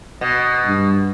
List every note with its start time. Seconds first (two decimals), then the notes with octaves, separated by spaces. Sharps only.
0.21 B2
0.66 G2